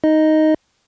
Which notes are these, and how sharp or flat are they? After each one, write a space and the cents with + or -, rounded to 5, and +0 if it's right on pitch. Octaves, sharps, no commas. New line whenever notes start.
D#4 +5 D#5 +0